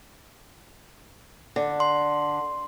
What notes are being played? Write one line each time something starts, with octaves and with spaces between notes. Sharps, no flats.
D3
C6